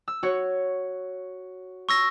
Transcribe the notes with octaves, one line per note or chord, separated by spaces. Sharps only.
E6
F#4 C#5
C#6 E6 A#6